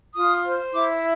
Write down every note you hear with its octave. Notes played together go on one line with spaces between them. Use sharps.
F4 D#6
C5
E4 D6